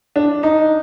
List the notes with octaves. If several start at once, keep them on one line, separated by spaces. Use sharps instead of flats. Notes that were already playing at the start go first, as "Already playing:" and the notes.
D4
D#4